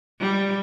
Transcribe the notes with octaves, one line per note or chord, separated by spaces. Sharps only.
G3